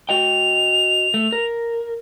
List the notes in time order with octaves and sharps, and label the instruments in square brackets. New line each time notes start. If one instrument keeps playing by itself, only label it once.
[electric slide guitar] F#4 D#5 G5 [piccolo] F7
[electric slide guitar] A3
A#4